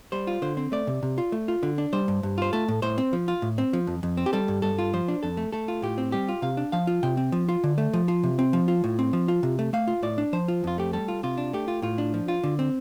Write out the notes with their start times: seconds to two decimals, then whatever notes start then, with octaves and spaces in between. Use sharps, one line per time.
0.12 G3 C5
0.27 F4
0.42 D3 C5
0.57 C4
0.72 A3 D5
0.87 C3
1.03 C3
1.18 F4
1.32 A3
1.48 F4
1.63 D3
1.78 D4
1.93 G3 C5
2.08 G2
2.23 G2
2.38 F4 C5
2.53 A3 A4
2.68 A2
2.82 A2 C5
2.98 C4
3.13 F3
3.28 F4
3.42 A2
3.58 C4
3.73 F3
3.87 F2
4.03 F2
4.17 C4
4.26 G4
4.33 G3 A4
4.48 G2
4.62 G2 A4
4.78 F4
4.93 F3 C5
5.08 D4
5.23 F2 A4
5.37 A3
5.53 A3 A4
5.68 F4
5.82 A2 G4
5.98 C4
6.12 G3 G4
6.29 F4
6.42 C3 F5
6.57 D4
6.72 F3 F5
6.87 F4
7.03 C3 G5
7.17 C4
7.32 F3
7.49 F4
7.64 D3
7.78 A3
7.93 F3
8.08 F4
8.23 C3
8.39 C4
8.53 F3
8.68 F4
8.84 A2
8.99 C4
9.13 F3
9.28 F4
9.43 C3
9.59 A3
9.73 A3 F5
9.88 F4
10.03 A2 D5
10.18 D4
10.33 F3 C5
10.48 F4
10.64 F2 F4
10.78 A3 G4
10.93 G3 A4
11.08 F4
11.23 C3 F4
11.38 D4
11.53 A3 G4
11.68 F4
11.82 A2 F4
11.98 D4
12.14 F3
12.28 F4
12.43 D3
12.59 C4